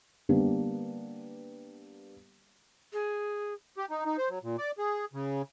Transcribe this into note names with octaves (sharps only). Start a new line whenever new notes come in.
D3 G3 A#3 B3 D4 G4
G#4
G4
D#4
D#4
C5
F#3
A#2
D5
G#4
C#3